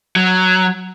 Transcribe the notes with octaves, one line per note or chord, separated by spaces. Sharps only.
F#3